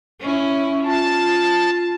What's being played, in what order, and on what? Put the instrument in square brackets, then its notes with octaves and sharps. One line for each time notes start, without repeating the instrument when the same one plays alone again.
[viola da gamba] C#4 E4
[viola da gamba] F4 [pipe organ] A5